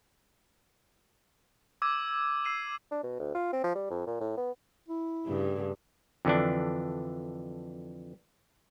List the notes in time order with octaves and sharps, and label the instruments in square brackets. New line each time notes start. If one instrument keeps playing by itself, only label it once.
[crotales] D6 E6 G#6 D#7
E6 C7 D#7 F#7
[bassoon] D4
B2
D2
F4
C4
F3
G3
F2
A#2
A2
B3
[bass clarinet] E4
[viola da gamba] G2 C#3 A3
[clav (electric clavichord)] F2 D3 E3 D4